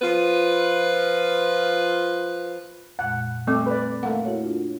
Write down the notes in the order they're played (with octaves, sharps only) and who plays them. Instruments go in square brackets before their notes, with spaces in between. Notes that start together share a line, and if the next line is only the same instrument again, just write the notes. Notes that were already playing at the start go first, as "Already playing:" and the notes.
[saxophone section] F3 F4 B4
[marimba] F2 A#2 G#3 [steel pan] F#5
[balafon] G3 C4 C#6 [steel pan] A3 [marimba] D6
[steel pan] B4 D5
[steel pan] A3 A#3 [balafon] F#5
[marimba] E4 F#4 C#5
D4 F4